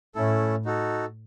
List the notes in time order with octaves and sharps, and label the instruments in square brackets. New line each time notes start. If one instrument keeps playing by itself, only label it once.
[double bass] A2 [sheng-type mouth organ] A3 C#4 E4 A4
[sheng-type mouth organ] D#4 F#4 A4